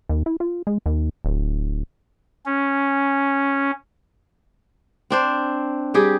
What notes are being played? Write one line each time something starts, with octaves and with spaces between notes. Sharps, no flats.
D#2
E4
F4
G#3
D#2
D1
C#4
C4 D4 C5
G3 G4 G#4